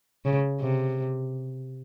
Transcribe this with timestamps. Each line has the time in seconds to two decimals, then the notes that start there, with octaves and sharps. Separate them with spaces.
0.25 C#3
0.61 C3